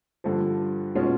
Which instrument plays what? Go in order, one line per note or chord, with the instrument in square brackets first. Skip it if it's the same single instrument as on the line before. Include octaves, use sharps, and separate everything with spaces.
[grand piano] G2 D3 F3
B2 G#3 C#4 F4